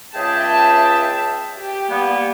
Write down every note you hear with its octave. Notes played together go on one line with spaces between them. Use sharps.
C#2 G#4 E5 G5 A5
G4
G3 A#3 B3